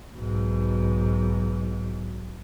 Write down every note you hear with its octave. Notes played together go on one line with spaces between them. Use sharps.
B1 G#2